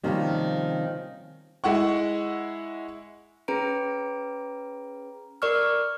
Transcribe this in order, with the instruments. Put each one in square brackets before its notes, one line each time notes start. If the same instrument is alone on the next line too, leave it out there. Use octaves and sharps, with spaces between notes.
[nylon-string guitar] C3 D#3 F3 G3 A#3 C#4
[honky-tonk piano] G#3 E4 F#5 C#6
[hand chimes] C#4 G#4 B4 A#5 D7
A#4 D5 C#6 F6